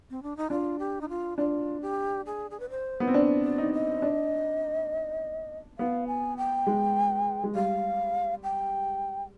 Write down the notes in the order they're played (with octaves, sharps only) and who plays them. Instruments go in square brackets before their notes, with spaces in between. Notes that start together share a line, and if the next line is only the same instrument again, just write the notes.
[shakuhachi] C4
D4
D#4
[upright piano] D4 [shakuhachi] F4
[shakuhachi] G4
D#4
F4
[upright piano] D4 [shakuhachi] F4
[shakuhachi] G4
G#4
G#4
B4
C5
[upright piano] B3
C4
D4
[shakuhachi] D5
[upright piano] D#4
[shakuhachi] D#5
[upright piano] D4
[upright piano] B3 [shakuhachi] F5
[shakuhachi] G#5
G5
[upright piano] G#3
G#3
[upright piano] G3 [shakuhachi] F5
[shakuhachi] G5